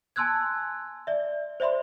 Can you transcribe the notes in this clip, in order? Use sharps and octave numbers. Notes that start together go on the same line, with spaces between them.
G#5 A5 C6 E6 F#6 G#6
D5 E5
C5 D5 E5 B5 C6